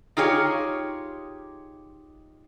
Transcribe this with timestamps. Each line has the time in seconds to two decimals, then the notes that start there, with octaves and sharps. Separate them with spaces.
0.17 D#4 F4 G4 G#4 C#5